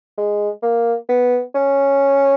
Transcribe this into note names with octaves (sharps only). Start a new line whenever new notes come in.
G#3
A#3
B3
C#4